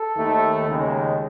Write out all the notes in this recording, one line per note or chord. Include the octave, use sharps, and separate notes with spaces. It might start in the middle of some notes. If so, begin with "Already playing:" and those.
Already playing: A4
D#2 D#3 A3
D#2 C#3 G#3